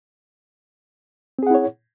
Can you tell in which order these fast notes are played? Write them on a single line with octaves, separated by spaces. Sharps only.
C4 G#4 F#5 E4 C#5